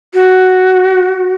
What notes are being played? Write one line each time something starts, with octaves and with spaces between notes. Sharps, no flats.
F#4